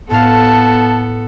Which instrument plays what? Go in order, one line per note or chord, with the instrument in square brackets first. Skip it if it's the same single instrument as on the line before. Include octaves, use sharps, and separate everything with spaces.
[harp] A2 F5 [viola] B3 A4 [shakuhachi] A5